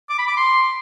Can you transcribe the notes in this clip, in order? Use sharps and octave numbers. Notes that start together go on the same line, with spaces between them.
D6
B5
D6
C6